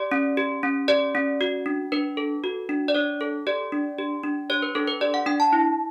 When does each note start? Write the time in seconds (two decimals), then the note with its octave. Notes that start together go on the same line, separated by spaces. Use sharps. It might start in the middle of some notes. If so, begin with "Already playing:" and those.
Already playing: G4 D5
0.12 C#4
0.37 G4
0.63 C#4
0.88 G4 D5
1.15 C#4
1.41 F#4
1.66 D4
1.92 D4 B4
2.17 A4
2.44 F#4
2.69 D4
2.88 D5
2.95 D4 C#5
3.21 A4
3.47 G4 D5
3.72 D4
3.98 G4
4.23 D4
4.50 G4 C#5
4.62 B4
4.75 D4 A4
4.87 B4
5.01 G4 D5
5.14 F#5
5.26 D4 G5
5.40 A5
5.53 E4